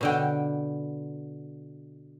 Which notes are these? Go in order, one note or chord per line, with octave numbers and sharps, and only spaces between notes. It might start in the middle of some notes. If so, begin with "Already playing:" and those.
B2 D3 G5